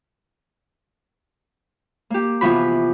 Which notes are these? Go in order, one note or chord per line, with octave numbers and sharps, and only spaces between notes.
A#3 G4
C3 E3 F3 B3 F#4 B5